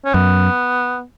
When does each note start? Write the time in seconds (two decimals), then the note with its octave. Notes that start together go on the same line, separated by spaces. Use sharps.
0.05 C#4
0.14 F#2 B3